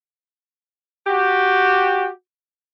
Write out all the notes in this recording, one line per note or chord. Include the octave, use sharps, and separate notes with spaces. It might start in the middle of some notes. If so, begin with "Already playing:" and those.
F#4 G4